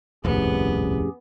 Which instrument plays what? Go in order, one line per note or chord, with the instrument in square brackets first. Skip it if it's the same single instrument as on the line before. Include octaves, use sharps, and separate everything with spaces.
[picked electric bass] D#1 C2 [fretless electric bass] F2 A2 [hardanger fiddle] B3 [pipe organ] C#4 G4 G#4